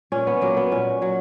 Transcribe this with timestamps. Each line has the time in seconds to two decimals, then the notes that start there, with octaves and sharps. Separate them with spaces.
0.12 A#2 C#4
0.27 B3
0.41 F#3 A#3
0.57 B3
0.72 A#2 C#4
1.02 F#3